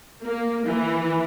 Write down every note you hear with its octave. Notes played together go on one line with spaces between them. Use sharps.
A#3
E3